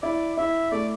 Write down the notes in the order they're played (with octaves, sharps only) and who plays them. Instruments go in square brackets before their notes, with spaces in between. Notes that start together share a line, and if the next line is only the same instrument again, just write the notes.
[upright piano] E4 [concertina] D5
[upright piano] E4 [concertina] E5
[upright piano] A3 [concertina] D5